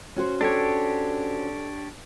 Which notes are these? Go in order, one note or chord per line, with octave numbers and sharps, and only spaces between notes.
C#4 F#4 C5
D4 G4 A4 C#5 A5